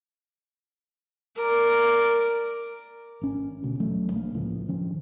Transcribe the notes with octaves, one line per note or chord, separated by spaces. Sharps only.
A#4 D5
G#1 C#4
D2 B2
D#1 E3 F#3 A3
A#1 A#3
C#2 A2 C#3 F3
G2 D#3 F3 C#4